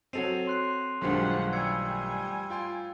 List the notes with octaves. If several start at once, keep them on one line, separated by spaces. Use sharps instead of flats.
F#3 C4 A4 D#5 C7 D#7 F7
C6 F#6 C7
B1 G2 D#3 F3 F#3 G#3 A3 F#5
G3 D5 G#5 E6 G#6 C#7
F4 G5 C6